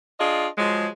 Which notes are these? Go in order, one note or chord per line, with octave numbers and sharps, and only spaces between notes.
D4 F4 G#4 D#5
F3 F#3 G#3